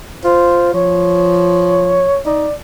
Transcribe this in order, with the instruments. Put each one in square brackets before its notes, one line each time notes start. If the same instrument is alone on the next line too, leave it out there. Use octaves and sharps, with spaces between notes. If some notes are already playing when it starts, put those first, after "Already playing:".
[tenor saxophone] F4 [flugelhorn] C5
[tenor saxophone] F3 [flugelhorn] C#5
[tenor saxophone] D#4 [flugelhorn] D5